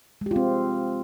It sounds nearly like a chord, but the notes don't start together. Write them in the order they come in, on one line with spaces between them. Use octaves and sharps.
G#3 G4 F4 C4